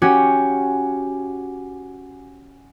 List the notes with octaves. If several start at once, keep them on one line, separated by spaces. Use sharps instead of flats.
C#4 F#4 G4